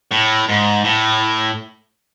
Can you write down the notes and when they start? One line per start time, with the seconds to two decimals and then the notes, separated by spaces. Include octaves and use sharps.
0.11 A2
0.49 G#2
0.84 A2